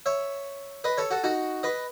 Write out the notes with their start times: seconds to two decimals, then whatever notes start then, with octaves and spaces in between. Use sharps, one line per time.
0.06 C#5 E5
0.84 B4 D#5
0.97 A4 C#5
1.11 F#4 A4
1.24 D#4 F#4
1.63 B4 D#5